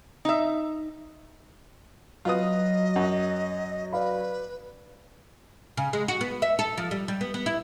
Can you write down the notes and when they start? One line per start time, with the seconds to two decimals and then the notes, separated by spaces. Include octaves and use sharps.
0.25 D#4 E5
2.25 F#3 F4 B4 D#5 D#6
2.96 F#2 F#5
3.93 B4 D5 F5 B5
5.77 C#3
5.93 G#3
6.08 F#4
6.21 B3
6.42 E5
6.59 A4
6.78 F3
6.91 G3
7.08 G3
7.21 B3
7.34 B3
7.46 E4